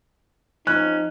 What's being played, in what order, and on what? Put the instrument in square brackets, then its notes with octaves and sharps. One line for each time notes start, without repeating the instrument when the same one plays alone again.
[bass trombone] F3 [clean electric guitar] C#4 [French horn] D#4 [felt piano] F#6